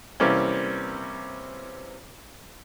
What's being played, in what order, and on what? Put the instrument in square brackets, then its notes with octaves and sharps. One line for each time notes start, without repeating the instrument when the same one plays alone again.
[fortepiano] C3 E3 G3 A#3 C4 C#4